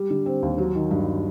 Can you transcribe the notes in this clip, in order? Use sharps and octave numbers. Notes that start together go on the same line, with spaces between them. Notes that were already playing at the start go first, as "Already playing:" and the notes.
Already playing: G3
D3
C4
D#2
F#3
D#3
G2